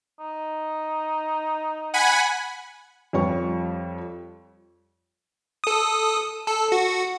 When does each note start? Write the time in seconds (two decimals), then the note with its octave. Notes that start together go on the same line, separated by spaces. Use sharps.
0.19 D#4
1.94 F#5 G#5 B5
3.13 F2 G3 C#5 C#6
5.64 A4 D#6
6.47 A4
6.72 F#4